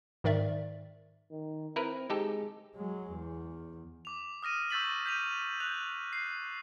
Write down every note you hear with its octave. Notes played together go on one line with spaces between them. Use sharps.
G#2 D#3 D5 E5
D#3
C4 E4 A#4 B4
G#3 D#4 G4 A4
F#3 G#3
E2
D6 F7
D#6 F6 A#6 D#7
C#6 E6 G6 A6 B6 F#7
G6 B6 D#7 F7
F#6 G6 F7
C7